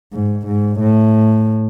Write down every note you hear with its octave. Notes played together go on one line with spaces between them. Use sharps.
G#2
G#2
A2